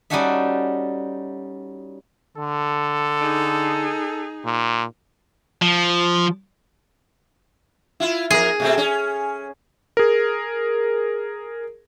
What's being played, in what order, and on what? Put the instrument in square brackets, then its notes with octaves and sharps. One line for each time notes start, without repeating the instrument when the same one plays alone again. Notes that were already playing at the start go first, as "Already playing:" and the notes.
[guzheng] G3 C#4 D#4 F#4 A4 E5
[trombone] D3 [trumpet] A4
[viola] D#4 G#4
[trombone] A#2
[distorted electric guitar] F3
[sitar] E4 F4
[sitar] F2 A#4 [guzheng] G#4
[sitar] B2 A3 C4
C#4
[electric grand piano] G#4 A#4